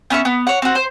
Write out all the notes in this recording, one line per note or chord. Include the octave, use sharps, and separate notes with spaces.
B3 C#4 E5 C#6
B3
C#5 F#5
C4 F#4
C5